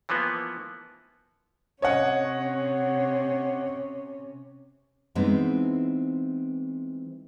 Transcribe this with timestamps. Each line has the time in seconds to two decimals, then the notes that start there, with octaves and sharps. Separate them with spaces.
0.09 E3 F3 A#3 B3
1.82 C3 C#4 C#5 D#5 F#5
5.15 E3 G#3 B3 C4 D#4 E4